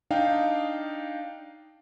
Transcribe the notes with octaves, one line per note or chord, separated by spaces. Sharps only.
D4 D#4 F5 G5